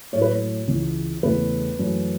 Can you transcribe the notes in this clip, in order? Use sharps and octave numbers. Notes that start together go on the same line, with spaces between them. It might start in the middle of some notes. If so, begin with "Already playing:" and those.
A2 F#3 A3 C#5
B4
C#5
C#2 C#3 E3
E2 C#3 A3 B4
F#2 E3 A3